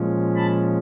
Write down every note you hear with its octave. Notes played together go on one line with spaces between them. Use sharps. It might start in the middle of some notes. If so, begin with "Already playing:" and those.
Already playing: A#2 F3 G#3 C#4
A5 B5